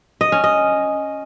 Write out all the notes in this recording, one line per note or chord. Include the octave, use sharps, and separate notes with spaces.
D#5
C#4
D#5